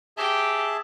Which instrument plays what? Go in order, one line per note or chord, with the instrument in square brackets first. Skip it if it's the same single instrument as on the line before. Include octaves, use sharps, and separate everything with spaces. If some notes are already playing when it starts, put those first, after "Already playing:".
[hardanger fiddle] G4 [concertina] G#4 E5 A5